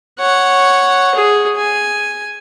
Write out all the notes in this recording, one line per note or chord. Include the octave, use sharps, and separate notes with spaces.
C#5 F#5
G#4
G#5